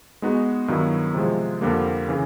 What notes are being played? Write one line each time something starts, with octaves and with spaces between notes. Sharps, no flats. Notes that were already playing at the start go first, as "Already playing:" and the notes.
G#3 B3 D#4 F#4
G2 D#3 F#3 B3 E4
C3 F3 G#3
F2 D3 G3 A#3
C#3 E3